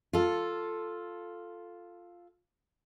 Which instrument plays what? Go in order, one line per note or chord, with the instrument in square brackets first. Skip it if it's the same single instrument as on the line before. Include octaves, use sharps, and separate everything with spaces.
[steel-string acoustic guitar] F4 A4